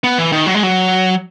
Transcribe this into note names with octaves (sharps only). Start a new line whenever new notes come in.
B3
E3
D#3
F#3
G#3
F#3